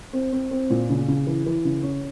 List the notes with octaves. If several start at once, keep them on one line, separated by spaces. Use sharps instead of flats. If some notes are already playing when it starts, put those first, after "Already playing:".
C4
C4
C4
A#2
C#3
C#3
E3
E3
C#3
C#4